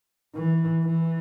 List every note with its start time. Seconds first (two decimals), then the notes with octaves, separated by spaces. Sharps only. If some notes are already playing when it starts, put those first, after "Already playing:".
0.35 E3
0.85 E3